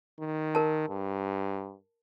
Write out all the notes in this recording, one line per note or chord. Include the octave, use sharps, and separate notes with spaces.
D#3
A#4 A5
G2